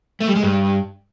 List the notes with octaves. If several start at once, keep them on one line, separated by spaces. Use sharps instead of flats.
A3
G3
G#3
G2